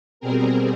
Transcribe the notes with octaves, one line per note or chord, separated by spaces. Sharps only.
B2 G3 C4 G#4 A#4